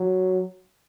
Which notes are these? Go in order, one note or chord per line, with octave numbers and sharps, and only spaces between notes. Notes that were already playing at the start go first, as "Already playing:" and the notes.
Already playing: F#3